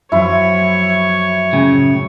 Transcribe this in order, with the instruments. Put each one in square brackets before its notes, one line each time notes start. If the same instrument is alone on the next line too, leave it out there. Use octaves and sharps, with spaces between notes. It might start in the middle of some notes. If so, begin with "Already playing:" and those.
[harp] F#2 F3 [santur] E4 [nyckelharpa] C#5
[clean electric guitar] A2 C#3